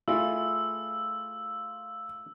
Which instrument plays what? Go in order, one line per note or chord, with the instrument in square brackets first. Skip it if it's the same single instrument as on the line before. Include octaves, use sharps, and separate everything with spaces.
[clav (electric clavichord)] A3 E4 G#4 [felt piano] F4 [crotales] E6